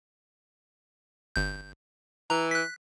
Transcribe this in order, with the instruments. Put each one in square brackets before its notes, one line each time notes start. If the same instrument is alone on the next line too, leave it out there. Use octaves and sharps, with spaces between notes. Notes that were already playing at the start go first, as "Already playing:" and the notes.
[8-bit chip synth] G1 G6
[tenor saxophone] E3 [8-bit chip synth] A#5
[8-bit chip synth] F#6 B6